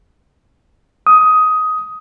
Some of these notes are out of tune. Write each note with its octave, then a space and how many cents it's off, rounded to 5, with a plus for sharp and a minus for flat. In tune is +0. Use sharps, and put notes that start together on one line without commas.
D#6 +15